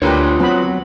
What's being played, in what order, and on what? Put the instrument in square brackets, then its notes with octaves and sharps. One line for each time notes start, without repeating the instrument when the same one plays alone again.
[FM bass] D2 [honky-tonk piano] D3 D4 [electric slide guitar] F4 C#5 [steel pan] G4 A#4 B4
[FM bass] F#3 [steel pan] B3 B5 [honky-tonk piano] C4